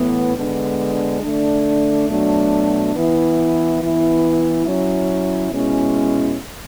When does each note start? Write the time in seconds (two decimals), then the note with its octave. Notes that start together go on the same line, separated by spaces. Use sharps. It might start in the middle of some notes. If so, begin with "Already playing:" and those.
Already playing: A2 E3 B3
0.36 D3 G#3 B3 D4
1.21 D3 A3 D4
2.08 B2 F#3 A3 D4
2.94 E3 B3 E4
3.80 E3 B3 E4
4.65 F#3 C#4 E4
5.52 B2 G#3 C#4 E4